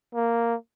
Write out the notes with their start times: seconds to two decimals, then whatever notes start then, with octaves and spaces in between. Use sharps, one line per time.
0.15 A#3